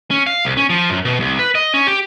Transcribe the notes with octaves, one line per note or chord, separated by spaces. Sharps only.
C#4
F5
C2
C#4
F3
F#2
B2
C2
B4
D#5
C#4
G4